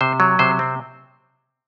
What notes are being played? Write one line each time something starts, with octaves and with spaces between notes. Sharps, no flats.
C3 C5
F#3
C3 C5
C4